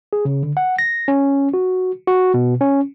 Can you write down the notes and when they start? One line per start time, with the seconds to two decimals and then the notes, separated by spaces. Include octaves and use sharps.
0.13 G#4
0.25 C#3
0.43 D3
0.57 F#5
0.79 A#6
1.08 C#4
1.54 F#4
2.07 F#4
2.34 B2
2.61 C#4